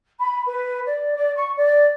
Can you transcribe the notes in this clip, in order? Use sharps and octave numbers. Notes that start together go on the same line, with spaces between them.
B5
B4
D5
D5
C#6
D5